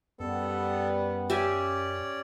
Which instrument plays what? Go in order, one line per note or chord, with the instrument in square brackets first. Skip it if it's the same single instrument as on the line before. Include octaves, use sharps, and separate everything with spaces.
[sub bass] F#2 [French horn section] G3 B3 [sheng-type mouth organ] A4
[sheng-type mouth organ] C#4 D5 [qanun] G4 E5 G#5